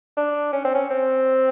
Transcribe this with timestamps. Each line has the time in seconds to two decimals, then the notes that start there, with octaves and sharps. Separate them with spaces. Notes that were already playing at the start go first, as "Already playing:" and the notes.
0.17 D4
0.53 C#4
0.65 C4
0.75 C#4
0.90 C4